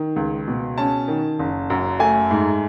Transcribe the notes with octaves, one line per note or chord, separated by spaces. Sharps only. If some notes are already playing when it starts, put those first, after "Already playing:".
Already playing: D#3
C#2
B2
C#4 A5
D#3
F#1
F#2
A3 G#5
G#2